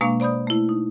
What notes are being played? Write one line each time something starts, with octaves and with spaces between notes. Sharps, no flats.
B2 G#3 A#3 D4 F5 C#6
C5 D5 B5 D#6 G6
A3 E4
D#4